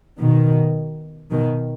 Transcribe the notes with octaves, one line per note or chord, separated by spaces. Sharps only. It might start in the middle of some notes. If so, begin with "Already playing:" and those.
B2 D#3
B2 D#3